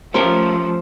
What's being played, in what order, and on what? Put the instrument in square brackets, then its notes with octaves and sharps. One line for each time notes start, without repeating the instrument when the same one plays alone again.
[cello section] F3 A3 [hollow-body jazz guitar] C#4 G4 A#4 [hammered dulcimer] C5